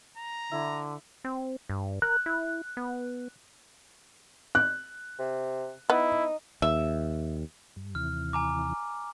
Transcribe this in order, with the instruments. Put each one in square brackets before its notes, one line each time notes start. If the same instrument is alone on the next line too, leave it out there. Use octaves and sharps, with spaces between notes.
[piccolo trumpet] A#5
[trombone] D3 [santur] E4
[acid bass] C4
G2
[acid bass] A#4 [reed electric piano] F#6
[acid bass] E4
B3
[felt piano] F#6
[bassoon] C3
[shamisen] B3 [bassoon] D#4 [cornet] E4
[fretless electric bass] D#2 [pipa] E5
[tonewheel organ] G2
[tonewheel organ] D#2 C3 E3 [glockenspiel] F6
[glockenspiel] G#5 A#5 D6